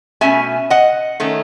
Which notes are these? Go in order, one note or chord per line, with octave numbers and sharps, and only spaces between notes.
B2 A3 C#4 E5 G#5
D#5 F#5
D#3 A3 C#4